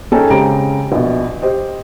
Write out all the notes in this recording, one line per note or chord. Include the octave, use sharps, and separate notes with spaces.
C#4 D#4 G#4 A4 G5 G#5
C#3 G#3 C4 G4 A#5 D7
A#1 B2
G4 C5 D#5